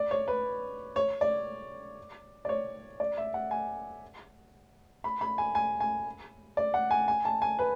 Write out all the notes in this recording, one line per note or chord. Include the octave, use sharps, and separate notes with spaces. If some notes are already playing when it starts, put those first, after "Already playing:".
Already playing: D5
C#5
B4
C#5
D5
D5
C#5
D5
E5
F#5
G#5
B5
B5
G#5
G#5
G#5
D5
F#5
G#5
G#5
A5
G#5
B4